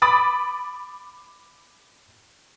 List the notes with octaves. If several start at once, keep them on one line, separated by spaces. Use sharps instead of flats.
B5 D6 D#6 A6